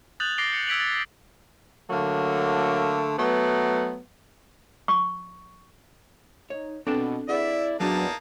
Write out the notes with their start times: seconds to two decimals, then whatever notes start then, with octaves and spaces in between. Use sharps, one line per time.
0.20 D#6 F#6 G6 A6 F7 F#7
0.38 D6 A6 A#6 C7 D7 G7
0.52 A6 C#7 F7
0.67 E6 G#6 B6 D7 F7 F#7
0.80 A6
1.90 D3 F#3 A3 A#3
3.19 F#3 A3 B3
4.88 C#6
6.50 D#4 C#5
6.87 B2 C4 D4 A4 G5 A5
7.29 E4 G#4 B4 D5 E5 F#5
7.80 E2 F#3 A#3 D4 D#4 A5